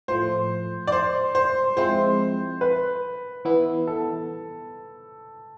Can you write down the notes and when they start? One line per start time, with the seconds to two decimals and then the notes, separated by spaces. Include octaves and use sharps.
0.08 A2 F3 A3 C5
0.87 D5
0.92 C5
1.35 C5
1.76 F3 G#3 C4 E4 C5
2.61 B4
3.45 E3 B3 E4
3.87 A4